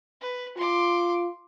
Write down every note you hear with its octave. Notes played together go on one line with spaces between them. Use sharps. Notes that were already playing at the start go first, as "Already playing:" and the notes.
B4
F4 C6 D6